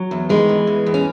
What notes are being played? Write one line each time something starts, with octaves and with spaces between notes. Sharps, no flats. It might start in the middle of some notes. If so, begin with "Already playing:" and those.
Already playing: F#3
E2
D#3 E3 G#3
E2
E2
E2
C#4